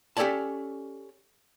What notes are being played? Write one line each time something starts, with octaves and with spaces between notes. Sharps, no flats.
C#4 G4 A4 C#5 D5 A5